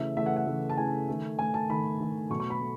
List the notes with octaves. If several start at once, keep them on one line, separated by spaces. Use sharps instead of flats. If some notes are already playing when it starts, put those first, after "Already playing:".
Already playing: C#3 E3 A3 E5
C#3 E3 A3 E5
F#5
F#5
C#3 E3 A3
A5
C#3 E3 A3 G#5
D#3 A3
D#3 A3 G#5
A5
D#3 A3 B5
D#3 A3
B2 F#3 A3 C#6
C#6
B5
A3